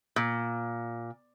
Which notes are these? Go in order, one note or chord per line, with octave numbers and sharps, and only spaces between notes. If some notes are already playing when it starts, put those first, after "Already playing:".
A#2